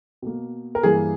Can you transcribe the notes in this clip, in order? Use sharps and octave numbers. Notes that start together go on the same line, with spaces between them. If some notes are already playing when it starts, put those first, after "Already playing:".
B2 A#3
A#4
G2 E3 A#3 G#4